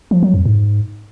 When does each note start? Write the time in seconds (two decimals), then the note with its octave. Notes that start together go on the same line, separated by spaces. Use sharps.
0.11 F3
0.23 F#3
0.34 F2
0.45 G#2